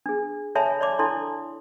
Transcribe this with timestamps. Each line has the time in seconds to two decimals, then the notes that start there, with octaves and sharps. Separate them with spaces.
0.06 D4 G#4
0.55 A4 C#5 E5 G#5 A5 B5
0.81 C#5 D5 B5 D6
0.99 D4 E4 A4 A5 C6